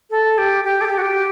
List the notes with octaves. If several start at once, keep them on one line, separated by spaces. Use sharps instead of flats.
A4
G4
G4
A4
G4
F#4
G4